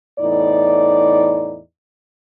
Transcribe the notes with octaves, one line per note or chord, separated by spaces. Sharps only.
E2 A2 D#4 D5